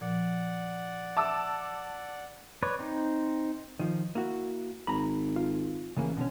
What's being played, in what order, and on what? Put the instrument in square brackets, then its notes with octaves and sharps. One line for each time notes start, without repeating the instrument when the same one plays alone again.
[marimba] A#2 F3 [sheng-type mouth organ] D5 F#5
[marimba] E5 [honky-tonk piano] A5 D6 E6
[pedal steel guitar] B4 C#5 D5
C4 D#4
[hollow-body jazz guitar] D#3 F3
A#3 E4 F#4
[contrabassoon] G#1 [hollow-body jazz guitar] A#5 B5
[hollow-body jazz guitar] F4
[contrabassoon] A1 [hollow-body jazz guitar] C#3 E3 A#3
[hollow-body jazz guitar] B2 D3 C#4